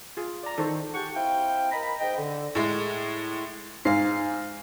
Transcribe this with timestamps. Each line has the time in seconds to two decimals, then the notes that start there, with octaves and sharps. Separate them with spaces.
0.17 F4 G#4
0.43 D5 A#5
0.58 D#3 A4 C5 C#6
0.94 G4 G#4 F#5 G5 A5 C#6
1.16 C4 E4 F5 G5
1.72 A#4 D#5 A#5 B5
2.00 G#2 D#5 G5
2.17 D3
2.55 A2 G#3
3.85 G#2 F5 C7